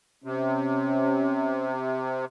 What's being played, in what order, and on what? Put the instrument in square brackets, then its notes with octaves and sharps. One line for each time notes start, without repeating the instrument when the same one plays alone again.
[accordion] C3 [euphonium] C#4